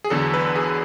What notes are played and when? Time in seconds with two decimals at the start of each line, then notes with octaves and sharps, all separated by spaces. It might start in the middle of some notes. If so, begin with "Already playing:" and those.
0.04 G#4
0.10 E2 D3 F#3 A4
0.34 B4
0.56 G#4